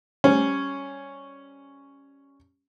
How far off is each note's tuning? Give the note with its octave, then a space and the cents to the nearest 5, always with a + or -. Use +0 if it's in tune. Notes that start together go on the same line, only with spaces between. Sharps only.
G3 +0 C#4 +0 C5 +0